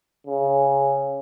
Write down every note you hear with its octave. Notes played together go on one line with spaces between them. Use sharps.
C#3